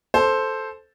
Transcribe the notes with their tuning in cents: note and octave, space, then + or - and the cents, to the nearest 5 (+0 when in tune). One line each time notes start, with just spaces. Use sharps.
A4 -5 C5 +0